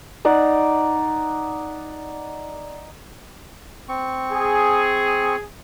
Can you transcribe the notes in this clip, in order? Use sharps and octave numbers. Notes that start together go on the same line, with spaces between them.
D#4 D5 F#5
C4 C#6
G#4